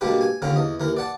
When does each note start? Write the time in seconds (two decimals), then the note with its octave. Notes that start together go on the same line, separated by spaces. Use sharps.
0.01 B2 G3 G#3 A#3 D4 G4
0.21 G#5
0.42 D#2 D3 C4 C#4 F4 A#5
0.56 E2 D#5
0.80 D#2 E3 A#4
0.97 D5 F#5 A5